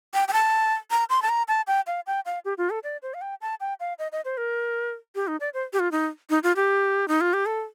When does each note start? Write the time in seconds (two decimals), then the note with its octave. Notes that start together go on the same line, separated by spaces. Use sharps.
0.14 G5
0.28 G5
0.33 A5
0.91 A#5
1.10 C6
1.22 A5
1.29 A#5
1.48 A5
1.67 G5
1.87 F5
2.07 G5
2.26 F5
2.45 G4
2.58 F4
2.70 A4
2.84 D5
3.03 C5
3.14 F5
3.21 G5
3.41 A5
3.60 G5
3.80 F5
3.99 D#5
4.12 D#5
4.25 C5
4.37 A#4
5.15 G4
5.28 D#4
5.40 D5
5.54 C5
5.73 G4
5.79 F4
5.92 D#4
6.30 D#4
6.43 F4
6.56 G4
7.08 D#4
7.21 F4
7.33 G4
7.46 A4